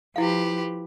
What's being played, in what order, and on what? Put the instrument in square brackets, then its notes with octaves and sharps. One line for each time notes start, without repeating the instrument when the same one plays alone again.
[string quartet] F3 G4 B4 [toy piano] E4 F5